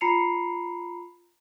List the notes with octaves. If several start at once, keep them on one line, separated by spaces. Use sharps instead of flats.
F4 A#5 B5 C7 C#7 F7